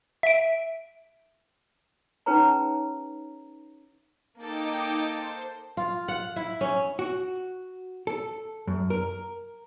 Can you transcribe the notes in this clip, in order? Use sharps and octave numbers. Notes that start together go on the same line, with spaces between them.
E5 D7
C#4 D#4 G#4 B4 C#5 A#5
A#3 D#4 A4 G5 D6
C5
F4
F#5
E4
C#4
F#4
A4
F#2
A#4